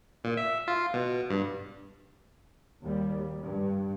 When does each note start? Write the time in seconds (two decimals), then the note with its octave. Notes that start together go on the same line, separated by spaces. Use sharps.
0.24 A#2
0.37 E5
0.68 F4
0.94 B2
1.30 G2
2.83 D#2 G3
3.44 G2